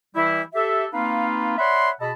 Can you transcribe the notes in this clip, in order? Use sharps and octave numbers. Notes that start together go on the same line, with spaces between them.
E3 G3 E4
G4 A4 E5
A#3 C4 D#4 F4 B4 F5
C#5 D5 E5 F#5 B5 C6
B2 G#4 D#5 A5 B5